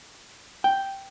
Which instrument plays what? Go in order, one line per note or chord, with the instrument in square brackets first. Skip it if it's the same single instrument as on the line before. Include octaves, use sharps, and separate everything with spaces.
[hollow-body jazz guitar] G5